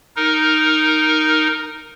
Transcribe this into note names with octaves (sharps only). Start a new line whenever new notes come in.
D#4 A#4